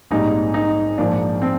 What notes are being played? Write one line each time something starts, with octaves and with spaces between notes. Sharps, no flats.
A#1 G#2 G3 C4 D#4
D#4
A#1 G#2 F3 A#3 D4
C4